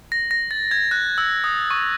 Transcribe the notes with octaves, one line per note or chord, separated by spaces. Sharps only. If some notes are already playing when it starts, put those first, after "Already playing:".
A#6
A#6
A6
G#6
F#6
E6
D#6
C#6